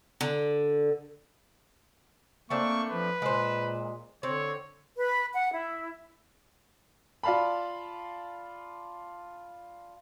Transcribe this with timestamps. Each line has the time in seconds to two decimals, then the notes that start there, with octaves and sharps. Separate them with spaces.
0.21 D3
2.50 A3 A#3 C4 D4 C#6
2.90 F3 B4
3.22 A#2 G#3 C5
4.23 D3 C4 C#5
4.97 B4
5.35 F#5
5.53 E4
7.23 F4 D5 F5 A5 B5